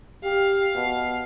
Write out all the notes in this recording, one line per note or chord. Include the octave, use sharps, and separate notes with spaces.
G4 F5
B2